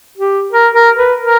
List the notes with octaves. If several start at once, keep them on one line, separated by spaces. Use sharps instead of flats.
G4
A#4
A#4
B4
A#4